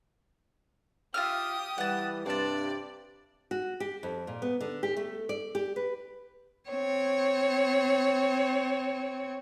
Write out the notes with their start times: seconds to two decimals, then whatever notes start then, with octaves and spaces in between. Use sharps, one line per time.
1.14 F4 G4 E5 D#6 F6
1.78 E3 G3 F#5 A5
2.26 G2 C3 D4 C5 D5 A5
3.51 F#4
3.80 G4
4.03 F2
4.27 A#2
4.42 B3
4.61 D3
4.83 G4
4.97 A3
5.29 D5
5.55 G4
5.76 B4
6.69 C4 C#5